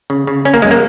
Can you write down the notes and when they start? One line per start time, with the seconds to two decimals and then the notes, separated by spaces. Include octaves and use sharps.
0.10 C#3
0.27 C#3
0.45 C#3 C#4
0.54 A#3
0.62 F#2 G#3
0.71 A#3